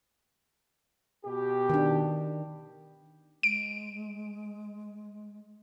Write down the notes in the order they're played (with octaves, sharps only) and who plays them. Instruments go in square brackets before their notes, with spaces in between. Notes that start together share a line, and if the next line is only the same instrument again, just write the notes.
[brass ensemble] B2 G4
[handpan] D#3 D4
[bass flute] G#3 [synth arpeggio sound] D7